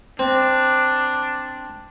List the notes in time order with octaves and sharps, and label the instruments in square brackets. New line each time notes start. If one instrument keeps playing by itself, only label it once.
[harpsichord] C4 [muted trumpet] D4